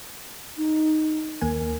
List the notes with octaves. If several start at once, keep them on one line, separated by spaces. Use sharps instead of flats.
D#4
D#2 A#3 A#4 G#5